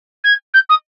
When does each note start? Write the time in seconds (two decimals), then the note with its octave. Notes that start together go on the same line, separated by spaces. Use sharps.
0.24 G#6
0.54 G6
0.69 D#6